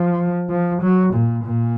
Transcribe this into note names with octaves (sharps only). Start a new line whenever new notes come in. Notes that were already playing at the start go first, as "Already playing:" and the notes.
Already playing: F3
F3
F#3
A#2
A#2